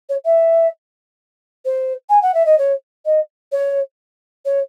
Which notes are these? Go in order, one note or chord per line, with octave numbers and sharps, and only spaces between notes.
C#5
E5
C5
G#5
F#5
E5
D#5
C#5
D#5
C#5
C#5